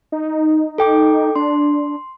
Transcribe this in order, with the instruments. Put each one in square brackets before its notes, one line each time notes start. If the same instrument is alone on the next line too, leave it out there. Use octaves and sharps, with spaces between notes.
[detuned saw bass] D#4
[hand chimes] A4 G5 D6
[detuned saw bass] D4 [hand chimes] C6